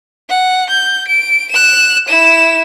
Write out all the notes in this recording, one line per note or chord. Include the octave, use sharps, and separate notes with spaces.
F#5
G6
D7
F#6 E7
E4 E7